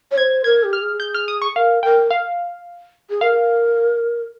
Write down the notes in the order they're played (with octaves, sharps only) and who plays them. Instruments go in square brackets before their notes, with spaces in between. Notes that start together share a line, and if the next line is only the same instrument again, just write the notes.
[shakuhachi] C#5
[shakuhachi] C5 [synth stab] G#6
[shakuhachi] A#4 [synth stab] G#6
[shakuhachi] G4
[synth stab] F6
[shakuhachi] G#4
[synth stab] G6
F6
D#6
C#6
[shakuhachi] A#4 [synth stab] F5
[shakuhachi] A#4 [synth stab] G5
[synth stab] F5
[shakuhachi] G#4
[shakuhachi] A#4 [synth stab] F5